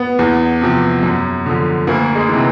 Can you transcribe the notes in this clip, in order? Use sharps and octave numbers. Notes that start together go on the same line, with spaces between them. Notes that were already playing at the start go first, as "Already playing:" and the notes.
Already playing: B3
E2
C3 F3
F#2
D3 F3
D2 A#3
G#3
C3 E3